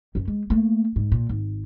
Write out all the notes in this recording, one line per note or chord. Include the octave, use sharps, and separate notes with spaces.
F#2 C#4
G#3
A3 A#3
G#2
A#2
G#1